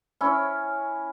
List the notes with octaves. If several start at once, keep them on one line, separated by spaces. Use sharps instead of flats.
C#4 E4 C#5